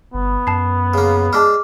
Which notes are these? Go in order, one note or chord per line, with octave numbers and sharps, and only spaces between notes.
G1 B3
F#2 A5 C7
C#3 A#3
G#3 D4 A5 D6 F6